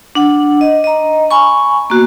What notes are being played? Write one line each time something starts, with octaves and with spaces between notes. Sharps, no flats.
D4 F#5
D#5
D#5 A#5
G#5 B5 C#6
A#3 B3 F#4